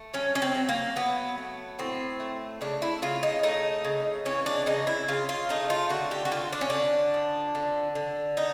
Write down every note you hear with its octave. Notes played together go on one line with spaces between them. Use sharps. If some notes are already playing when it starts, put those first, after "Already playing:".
Already playing: A3
F#3 C#4
C#4
C4
F#3
A#3
F#3 B3
A3
A2 C4
A3
C#3 D4
E4
C#3 F4
D#4
A3 D#4
C#3
E3 C#4
D4
C#3 D#4
E4
C#3 F4
F4
A3 D#4
F4
D3 F#4
G4
F#4
D3 F4
D4
C#4
D3 D4
F3
D3
D3
A3 D#4